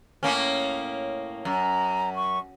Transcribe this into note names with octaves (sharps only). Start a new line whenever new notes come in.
A2 A#3 C#4
F#2 A#5
C#6